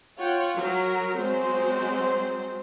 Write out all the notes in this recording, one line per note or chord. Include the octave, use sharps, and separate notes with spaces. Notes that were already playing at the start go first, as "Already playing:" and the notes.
F4 C#5 F#5 G5
F#3 A#4
F#3 G#3 C4 C5